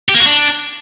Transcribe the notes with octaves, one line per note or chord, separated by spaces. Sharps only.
G4
A#3
F#4
D4